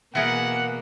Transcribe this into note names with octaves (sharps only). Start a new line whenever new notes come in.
B2 E3 A#3 G#4 A#4 F#5